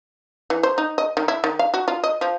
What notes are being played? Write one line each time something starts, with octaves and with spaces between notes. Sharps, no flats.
E3
C5
D#4
D#5
D#3
E4
D#3
F5
F#4
F4
D#5
F3